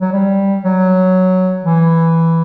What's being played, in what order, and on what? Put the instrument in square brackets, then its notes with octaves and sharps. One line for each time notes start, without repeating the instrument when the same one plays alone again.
[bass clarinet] F#3
G3
F#3
E3